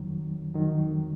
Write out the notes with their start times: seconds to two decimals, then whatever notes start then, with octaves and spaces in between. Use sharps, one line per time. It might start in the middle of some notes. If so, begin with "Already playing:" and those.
Already playing: F2 D#3 F#3
0.54 F2 D#3 F#3